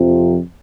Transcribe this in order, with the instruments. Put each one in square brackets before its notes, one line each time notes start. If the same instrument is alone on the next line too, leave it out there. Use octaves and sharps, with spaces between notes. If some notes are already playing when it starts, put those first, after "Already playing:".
Already playing: [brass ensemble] F2 C3 F3